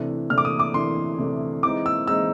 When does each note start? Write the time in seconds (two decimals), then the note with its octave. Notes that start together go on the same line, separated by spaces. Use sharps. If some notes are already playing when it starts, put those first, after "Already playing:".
Already playing: C3 E3 A3 D4
0.30 C3 E3 A3 D4 F6
0.38 D6
0.45 D#6
0.60 D6
0.74 C3 E3 A3 D4 C6
1.18 C3 E3 A3 D4
1.63 E3 G#3 C4 D#4 D6
1.86 E6
2.07 E3 G#3 C4 D#4 E6